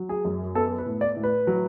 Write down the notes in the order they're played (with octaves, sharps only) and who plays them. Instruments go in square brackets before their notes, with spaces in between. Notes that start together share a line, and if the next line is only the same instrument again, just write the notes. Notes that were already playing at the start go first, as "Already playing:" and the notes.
Already playing: [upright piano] F#3
G#4
F#2
B3 A4
B4
A2
D5
A2
B4
F#3